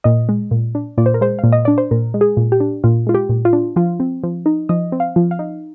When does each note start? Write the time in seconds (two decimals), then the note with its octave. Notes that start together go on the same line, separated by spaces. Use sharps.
0.04 A#2 D#5
0.29 G#3
0.51 A#2
0.75 D4
0.98 A#2 D5
1.06 C5
1.14 A#4
1.21 G#3 C5
1.39 A#2 F5
1.52 D#5
1.65 D4 D5
1.78 C5
1.91 A#2 A#4
2.14 G#3
2.21 G#4
2.37 A#2
2.52 G4
2.60 D4
2.84 A#2 F4
3.07 G#3 F4
3.14 G4
3.29 A#2
3.45 F4
3.53 D4
3.76 F3 F4
4.00 C4
4.23 F3
4.46 D#4
4.69 F3 D#5
4.92 C4
5.00 F5
5.16 F3
5.31 F5
5.39 D#4